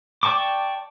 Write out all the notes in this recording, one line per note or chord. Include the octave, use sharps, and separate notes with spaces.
D5 G5 A5 C#6 D6